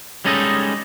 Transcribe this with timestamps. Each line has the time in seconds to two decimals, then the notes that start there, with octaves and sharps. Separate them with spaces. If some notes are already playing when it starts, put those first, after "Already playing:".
0.25 G3 G#3 C#4 D#4 A4 D#5